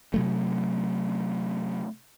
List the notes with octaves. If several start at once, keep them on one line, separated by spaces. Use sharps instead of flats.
C3 F#3 A3